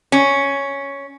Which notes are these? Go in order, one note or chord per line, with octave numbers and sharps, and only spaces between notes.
C#4